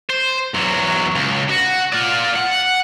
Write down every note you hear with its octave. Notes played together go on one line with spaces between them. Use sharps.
C5
E2 F#3
C#2
F#4
F4 D5
F#5